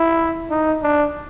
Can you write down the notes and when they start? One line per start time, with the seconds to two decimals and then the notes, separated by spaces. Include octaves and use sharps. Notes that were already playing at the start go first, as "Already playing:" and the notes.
Already playing: E4
0.50 D#4
0.82 D4